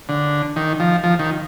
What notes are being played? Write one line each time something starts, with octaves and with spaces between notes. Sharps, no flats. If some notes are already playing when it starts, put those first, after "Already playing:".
D3
D#3
F3
F3
D#3